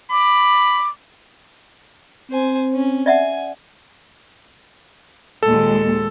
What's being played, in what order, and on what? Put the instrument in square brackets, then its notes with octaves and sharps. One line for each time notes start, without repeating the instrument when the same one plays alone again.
[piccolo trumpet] B5 [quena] D6
[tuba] C4 [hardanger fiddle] C5 G#5
[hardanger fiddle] C#4
[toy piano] D5 E5 F#5 [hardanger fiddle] G#5
[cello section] D#2 A#2 G#3 [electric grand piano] A4